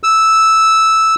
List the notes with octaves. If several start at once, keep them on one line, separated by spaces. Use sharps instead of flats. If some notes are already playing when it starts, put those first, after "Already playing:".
E6